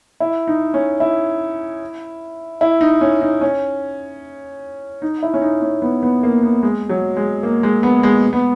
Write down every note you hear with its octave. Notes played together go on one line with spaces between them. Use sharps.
E4
D#4
C#4
E4
E4
D#4
C#4
D#4
C#4
D#4
E4
C#4
D#4
C#4
B3
B3
A#3
B3
G#3
F#3
G#3
A#3
G#3
B3
G#3
B3